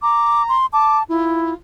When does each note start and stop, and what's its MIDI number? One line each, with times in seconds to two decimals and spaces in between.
0.02 0.56 82
0.02 0.43 86
0.49 0.66 84
0.73 1.03 81
0.73 0.98 86
1.09 1.53 64
1.09 1.55 65